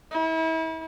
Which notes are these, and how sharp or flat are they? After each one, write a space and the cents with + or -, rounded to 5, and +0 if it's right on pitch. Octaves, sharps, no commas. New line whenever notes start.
E4 -35